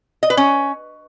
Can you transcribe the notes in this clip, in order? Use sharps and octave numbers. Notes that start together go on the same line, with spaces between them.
D#5
B4
C#4